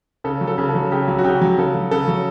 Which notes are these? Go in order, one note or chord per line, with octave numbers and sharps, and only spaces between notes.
C#3 A4
F#3
A4
C#3
A4
F#3
C#3 G4
F#3
F#4
C#3 G4
F#3
C#3 A4
F#3
C#3 A4
F#3